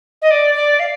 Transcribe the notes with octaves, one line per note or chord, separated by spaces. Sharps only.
D#5
D5
D5
F5